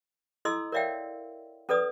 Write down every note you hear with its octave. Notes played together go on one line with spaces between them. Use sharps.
E4 A4 D#5 C6 E6
A#4 C#5 D5 E5 F5 G5
C#4 A4 B4 D5 D#6